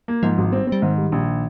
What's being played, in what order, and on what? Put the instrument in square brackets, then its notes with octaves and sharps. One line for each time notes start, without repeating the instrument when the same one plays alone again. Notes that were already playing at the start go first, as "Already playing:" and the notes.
[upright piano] A#3
[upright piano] G#2 [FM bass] F3
[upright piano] G#1
[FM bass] G3 [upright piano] C4
[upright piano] C4
[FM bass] G3
[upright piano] G#2 [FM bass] D#3
[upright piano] G3
A#1